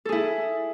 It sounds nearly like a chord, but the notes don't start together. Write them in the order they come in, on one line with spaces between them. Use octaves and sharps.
A4 G#4 E4